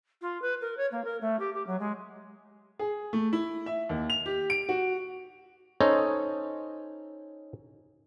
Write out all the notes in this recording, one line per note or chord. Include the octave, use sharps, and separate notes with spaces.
F4
B4
A#4
C#5
A#3
A#4
A3
G4
G4
F#3
G#3
G#4
A3
E4
E5
D#2
F7
G4
D7
F#4
C#4 D#4 A4 C5 C#5 D#5